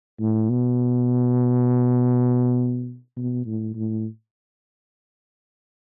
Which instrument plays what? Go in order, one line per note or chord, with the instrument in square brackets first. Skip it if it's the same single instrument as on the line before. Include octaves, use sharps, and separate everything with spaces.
[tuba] A2
B2
B2
A2
A2